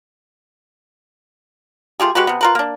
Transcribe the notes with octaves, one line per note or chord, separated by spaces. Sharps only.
A3 F4 G4 G#4
G#3 F#4 G4 B4
C3 B3
F4 A#4 B4
A#3 D4